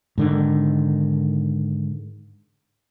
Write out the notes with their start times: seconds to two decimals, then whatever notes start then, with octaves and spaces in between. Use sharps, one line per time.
0.18 G#2 D3 D#3